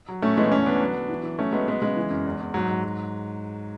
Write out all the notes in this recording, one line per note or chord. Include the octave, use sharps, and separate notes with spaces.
F#3
A2 A3 C#4
E3 G#3 B3
E2 A3 C#4
D3 B3 D4
F#3
F#3
E3
E3
F#3 A3 C#4
F#3 G#3 B3
F#3 G#3 B3
C#3 G#3
E3
F#2
E2
E2
G#2 F#3
G#2
F#3